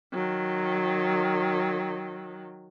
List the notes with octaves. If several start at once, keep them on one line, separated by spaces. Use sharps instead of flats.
D#3 F#3